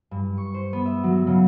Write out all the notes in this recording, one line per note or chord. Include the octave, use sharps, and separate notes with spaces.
G2
C#6
C5
B3
E5
F#3
C#3